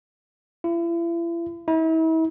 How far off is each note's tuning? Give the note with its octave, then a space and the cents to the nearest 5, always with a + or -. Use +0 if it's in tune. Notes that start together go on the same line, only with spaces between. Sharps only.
E4 +40
E4 -40